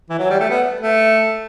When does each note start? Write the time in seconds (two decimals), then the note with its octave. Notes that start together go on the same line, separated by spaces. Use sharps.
0.09 E3
0.19 F#3
0.30 G3
0.40 A3
0.50 B3
0.80 A3